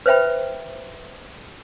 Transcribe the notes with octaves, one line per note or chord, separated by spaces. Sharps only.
B4 C5 E5 G5 B5